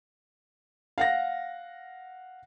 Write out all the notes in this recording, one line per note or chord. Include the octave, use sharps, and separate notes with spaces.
F5 F#5 A#6